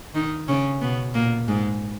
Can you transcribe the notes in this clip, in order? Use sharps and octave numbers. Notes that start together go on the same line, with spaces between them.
D#3 D#4
C#3 C#4
B2 B3
A#2 A#3
G#2 G#3